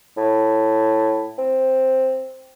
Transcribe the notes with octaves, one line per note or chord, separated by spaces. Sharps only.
A2
C4